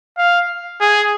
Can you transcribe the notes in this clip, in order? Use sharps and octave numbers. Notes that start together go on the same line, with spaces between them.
F5
G#4